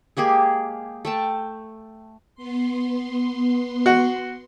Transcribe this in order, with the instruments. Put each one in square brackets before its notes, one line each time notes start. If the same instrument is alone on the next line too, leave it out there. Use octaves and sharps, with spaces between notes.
[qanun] G#3 A#3 G4 G#4
A3 G5 A5
[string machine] B3 C6
[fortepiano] F#4